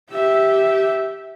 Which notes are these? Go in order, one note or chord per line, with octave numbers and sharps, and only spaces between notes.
G4 E5